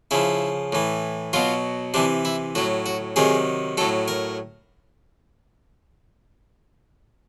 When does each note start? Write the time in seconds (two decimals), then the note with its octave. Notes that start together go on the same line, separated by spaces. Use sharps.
0.11 C#3 F3 E4
0.72 A2 E3
1.33 B2 F#3 F4
1.94 C3 E3 D4
2.25 E4
2.55 A2 F#3 F#4
2.86 F#4
3.16 C3 D#3 F#3 G#4
3.77 A2 F#3 A4
4.08 A#4